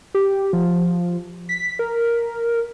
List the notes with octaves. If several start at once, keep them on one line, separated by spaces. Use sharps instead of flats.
G4
F3
B6
A#4